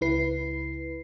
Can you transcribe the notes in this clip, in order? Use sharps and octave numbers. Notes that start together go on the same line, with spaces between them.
C#2 E4 B4 C7